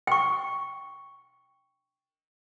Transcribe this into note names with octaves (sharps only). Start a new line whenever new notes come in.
G5 C#6